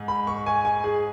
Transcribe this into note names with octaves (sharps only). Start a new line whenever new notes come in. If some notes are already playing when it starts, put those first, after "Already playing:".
Already playing: G#2
B5
C#6
G#5
G#5
G#4